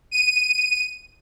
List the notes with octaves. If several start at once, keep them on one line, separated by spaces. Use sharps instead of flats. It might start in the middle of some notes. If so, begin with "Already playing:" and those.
D#7